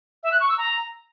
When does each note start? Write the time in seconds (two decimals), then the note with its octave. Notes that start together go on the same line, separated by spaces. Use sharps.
0.23 E5
0.31 F#6
0.40 C#6
0.49 E6
0.57 A#5